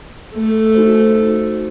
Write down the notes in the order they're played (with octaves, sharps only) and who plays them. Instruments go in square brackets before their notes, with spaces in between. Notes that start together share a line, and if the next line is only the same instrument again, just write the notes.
[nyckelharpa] A3
[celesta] D#4 F#4 C5